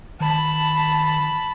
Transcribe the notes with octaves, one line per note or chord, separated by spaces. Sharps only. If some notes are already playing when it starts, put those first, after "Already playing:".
D#3 A5 B5